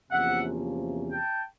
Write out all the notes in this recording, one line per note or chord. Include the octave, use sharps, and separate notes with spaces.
E2 C3 F3 A#3 C#4 E5 F#5
G5 A5